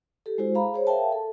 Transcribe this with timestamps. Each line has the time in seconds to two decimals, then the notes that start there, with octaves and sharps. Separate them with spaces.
0.26 G4 A4
0.38 G#3 E4 F#4 C5
0.55 G#4 F5 A#5 B5
0.74 G#4 C5 C#5
0.87 A#4 E5 F5 G5 A5
1.12 A4